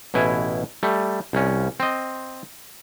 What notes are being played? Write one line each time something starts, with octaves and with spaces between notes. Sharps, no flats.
A1 B2 E4 G#5
G3 A3
C2 C#4
C4 D#5